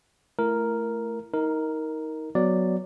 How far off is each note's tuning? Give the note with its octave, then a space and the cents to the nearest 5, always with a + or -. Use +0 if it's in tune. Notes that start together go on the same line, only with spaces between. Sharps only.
A3 +0 E4 +25 A#4 +0
D#4 +25 A#4 +0
F#3 +0 B3 +0 D5 +0